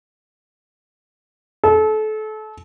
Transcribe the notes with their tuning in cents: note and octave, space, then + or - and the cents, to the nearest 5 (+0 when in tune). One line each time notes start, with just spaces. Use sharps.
A4 -30